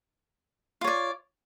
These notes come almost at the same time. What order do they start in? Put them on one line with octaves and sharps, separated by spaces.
F4 C#5 D5